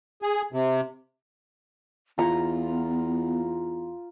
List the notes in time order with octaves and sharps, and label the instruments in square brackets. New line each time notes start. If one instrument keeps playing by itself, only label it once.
[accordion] G#4
C3
[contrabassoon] E2 [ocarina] B3 [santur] F4 A#5